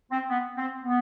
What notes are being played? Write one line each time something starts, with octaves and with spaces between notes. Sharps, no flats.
C4
B3
C4
B3